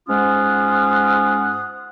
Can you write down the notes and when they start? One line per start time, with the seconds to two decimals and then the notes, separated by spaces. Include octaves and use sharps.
0.08 G#2 G#3 C#4 F4 F#5 D#6